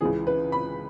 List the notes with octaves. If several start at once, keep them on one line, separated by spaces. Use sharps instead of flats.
C#2 C#3 E3 G#4
B4
B5